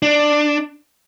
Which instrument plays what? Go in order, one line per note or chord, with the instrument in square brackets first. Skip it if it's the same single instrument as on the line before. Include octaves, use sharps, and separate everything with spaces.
[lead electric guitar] D4